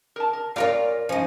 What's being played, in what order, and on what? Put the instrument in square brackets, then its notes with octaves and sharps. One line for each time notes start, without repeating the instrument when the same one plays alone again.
[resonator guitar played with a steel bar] A#4 A5
A#4
[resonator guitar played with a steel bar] A#2 D5 F5 [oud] F4 A#4 C#5
[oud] F3 D#4 [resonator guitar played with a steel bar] C#4